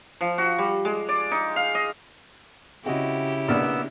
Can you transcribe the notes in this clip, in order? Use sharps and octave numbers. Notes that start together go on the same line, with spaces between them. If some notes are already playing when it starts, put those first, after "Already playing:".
F3
F#4
G3
G#3
D5
D#4
F5
D#5
C#3 C4 E4 F#4 G4 D#5
A#1 B2 A#3 B3 D5 E6 F6